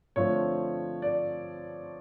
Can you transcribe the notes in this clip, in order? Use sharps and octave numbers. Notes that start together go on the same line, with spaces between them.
D3 F3 A3 C4 C#5
D5